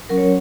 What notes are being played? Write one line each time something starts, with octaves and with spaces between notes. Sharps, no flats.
F#3 C#4 F#4 A#4
C#5